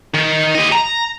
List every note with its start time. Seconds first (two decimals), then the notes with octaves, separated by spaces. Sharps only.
0.14 D#3
0.55 G4 D#5
0.72 A#5